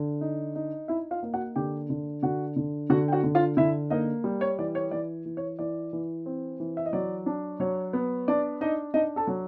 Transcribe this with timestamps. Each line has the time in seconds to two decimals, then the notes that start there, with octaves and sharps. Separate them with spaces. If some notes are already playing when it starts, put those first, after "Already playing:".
Already playing: D3
0.21 D#4
0.56 D#4
0.88 D#4 E4 E5
1.11 F4 F5
1.23 A#3
1.34 F#4 F#5
1.56 D3 G4 G5
1.90 D3
2.23 D3 F#4 F#5
2.56 D3
2.90 D3 F#4 F#5
3.08 G5
3.12 F#4 F#5
3.24 D3
3.35 F4 F5
3.57 D3 E4 E5
3.90 A#3 D#4 D#5
4.24 G3
4.41 C#5
4.59 E3 D5
4.75 C#5
4.91 E3 D5
5.26 E3
5.37 C#5
5.59 E3 D5
5.93 E3
6.26 C4
6.60 E3
6.77 E5
6.86 D#5
6.93 F#3 D5
7.26 D4
7.60 F#3 C#5
7.93 B3
8.28 D4 D5
8.61 D4 D#4 D#5
8.94 D4 D#4 D#5
9.16 A4 A5
9.27 F#3